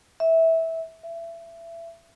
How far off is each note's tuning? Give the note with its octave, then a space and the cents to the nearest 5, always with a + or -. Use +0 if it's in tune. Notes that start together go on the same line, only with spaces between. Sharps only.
E5 -15
E5 +25